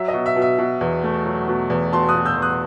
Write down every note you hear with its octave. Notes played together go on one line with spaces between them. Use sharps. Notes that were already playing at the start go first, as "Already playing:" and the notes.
Already playing: F#3 E5
D#5
B2
E5
B2
E5
B2
E2
A3
F#3
B2
E2
B2 A5 C6
D#6 F#6
B2
E6 G6
E2
D#6 F#6